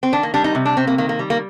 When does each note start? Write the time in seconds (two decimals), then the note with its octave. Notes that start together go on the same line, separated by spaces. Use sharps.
0.03 C4
0.12 D#3 D4
0.23 A#3
0.34 G3 D4
0.44 D#4
0.55 C3
0.65 D4
0.77 C3 C4
0.87 A#3
0.98 D#3 A#3
1.09 A#3
1.19 G3
1.30 A#3